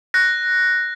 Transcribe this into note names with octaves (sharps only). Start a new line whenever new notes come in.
F#6 A#6